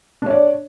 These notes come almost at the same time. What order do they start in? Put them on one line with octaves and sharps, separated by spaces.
D4 C#5 D5